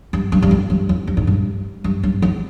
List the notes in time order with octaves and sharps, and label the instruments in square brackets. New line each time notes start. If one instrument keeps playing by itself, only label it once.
[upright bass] G2
G2
G2
F2
G2
F2
G2
G#2
G2
G2
G2
F2